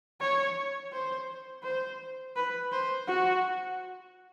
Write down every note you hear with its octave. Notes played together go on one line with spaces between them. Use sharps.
C#5
C5
C5
B4
C5
F#4